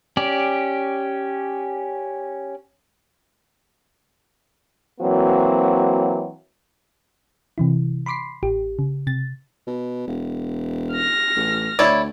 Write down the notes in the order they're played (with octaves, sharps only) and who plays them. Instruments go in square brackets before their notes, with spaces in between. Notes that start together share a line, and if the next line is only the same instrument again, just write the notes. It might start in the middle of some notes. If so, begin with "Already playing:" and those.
[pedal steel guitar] C#4 G4 D5
[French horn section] E3 F#3 A#3 C4 F#4
[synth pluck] C3 E3 E4
B5 C6 D6 B6 C7
A1 G4
C#3
C3 A6
[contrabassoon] B2
E1
[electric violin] F6 A#6
[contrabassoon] A1
[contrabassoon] D2 [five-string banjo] E4 C#5 D5